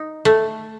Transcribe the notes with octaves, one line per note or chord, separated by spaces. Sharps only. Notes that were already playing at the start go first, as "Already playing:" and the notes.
Already playing: D#4
A3